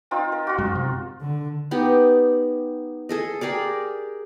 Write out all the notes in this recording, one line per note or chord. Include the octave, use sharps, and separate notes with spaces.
C4 D#4 F4
A#4
F4 F#4
F#2 G#3
C3
D3
B3 D#4 G4
G#4 A4 D#5
G4 G#4 A#4 D5